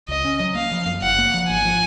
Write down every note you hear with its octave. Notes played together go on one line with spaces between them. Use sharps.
C#2 D#5
C#4
F#3
A#3 F5
F3
F#2
F#1 F#5
A#3
F3
G#1 G#5
F3